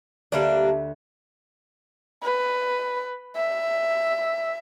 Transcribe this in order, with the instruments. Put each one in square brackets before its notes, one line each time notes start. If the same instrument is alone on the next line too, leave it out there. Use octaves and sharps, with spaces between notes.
[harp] D2 B4 E5 [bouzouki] G3 A#3 D4
[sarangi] B4
E5